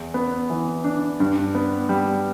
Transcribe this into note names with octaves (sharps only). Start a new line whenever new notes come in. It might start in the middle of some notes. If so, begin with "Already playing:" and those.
Already playing: E2
B3
E3
D4
G2
B3
G3